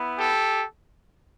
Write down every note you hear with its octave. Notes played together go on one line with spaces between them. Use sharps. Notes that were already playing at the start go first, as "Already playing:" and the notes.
Already playing: B3 E4
G4 A4